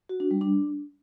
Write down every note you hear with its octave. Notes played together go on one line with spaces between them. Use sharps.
F#4
D4
G3
D4